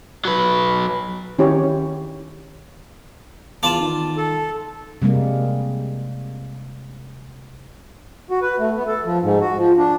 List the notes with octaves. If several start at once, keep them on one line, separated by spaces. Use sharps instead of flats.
F#3 B4
D#3 C#4 E4 G4 C#5
E2 F4 D5 A5 C6 D6 E7
D#3
A4
C3 G3 G#3 A#3
F#4
B4
A3
B3
A4
F3
G#2
F#4
F3
D4